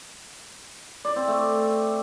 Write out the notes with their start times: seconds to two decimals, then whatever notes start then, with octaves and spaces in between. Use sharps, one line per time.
1.05 D5
1.16 C4
1.28 A3